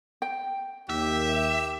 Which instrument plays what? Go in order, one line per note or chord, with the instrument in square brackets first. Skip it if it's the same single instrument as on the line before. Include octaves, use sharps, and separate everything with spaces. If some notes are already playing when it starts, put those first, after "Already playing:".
[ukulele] G5
[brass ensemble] D#2 [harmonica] G4 [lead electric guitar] E5